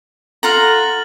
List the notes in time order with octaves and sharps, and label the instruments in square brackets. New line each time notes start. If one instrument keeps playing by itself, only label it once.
[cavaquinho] F4 F#5 A#5 [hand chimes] A4 [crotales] F6 A6 F#7